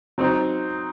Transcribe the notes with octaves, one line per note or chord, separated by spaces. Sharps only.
F#3 C4 D#4